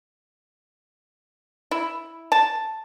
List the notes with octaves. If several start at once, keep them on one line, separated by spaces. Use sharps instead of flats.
E4
A5